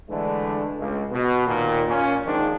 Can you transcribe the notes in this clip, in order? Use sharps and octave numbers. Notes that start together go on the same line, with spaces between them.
D3 E3 G#3 A3 D4
C#2
B2
D#2 A#2
A#2 C#4
D#2 G#2 D#3 F3 G#3 D4